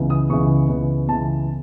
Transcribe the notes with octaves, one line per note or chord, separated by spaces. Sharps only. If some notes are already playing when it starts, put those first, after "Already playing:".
Already playing: C#2 C#3 E3 B3
D#6
C#2 C#3 E3 B3 C#6
C#2 C#3 E3 B3
C#2 C#3 E3 B3 A5